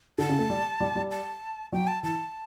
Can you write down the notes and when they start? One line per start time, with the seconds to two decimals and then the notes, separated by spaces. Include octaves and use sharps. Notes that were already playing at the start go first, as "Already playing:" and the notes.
0.18 D3 A5
0.29 C#3
0.39 A3
0.50 G3
0.80 G3
0.95 G3
1.11 A5
1.72 F#3 G5
1.87 A5
2.03 E3 A5